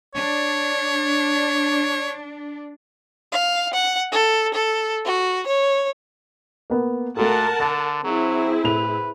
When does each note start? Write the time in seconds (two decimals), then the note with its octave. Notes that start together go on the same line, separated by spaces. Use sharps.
0.14 D4 C#5
3.33 F5
3.74 F#5
4.12 A4
4.55 A4
5.05 F#4
5.47 C#5
6.70 A#3 B3
7.17 A#2 A3 F#4 A4 A#4 F#5 A5
7.60 D3 A6
8.04 F#3 C4 E4 G#4
8.64 A2 B4 F7